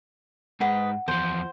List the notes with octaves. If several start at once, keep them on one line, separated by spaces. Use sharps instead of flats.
G#2 B4 D#5 F#5
E2 F3 C5